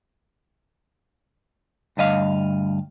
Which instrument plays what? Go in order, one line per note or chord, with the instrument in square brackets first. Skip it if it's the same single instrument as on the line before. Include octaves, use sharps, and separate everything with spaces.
[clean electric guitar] D2 G2 D#5 F5